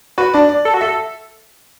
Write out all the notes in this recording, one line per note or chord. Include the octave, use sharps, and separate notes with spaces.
F#4 B4
D4 D5
D5
A4
F#4
A4 E5